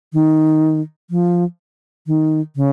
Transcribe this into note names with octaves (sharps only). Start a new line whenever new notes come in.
D#3
F3
D#3
C#3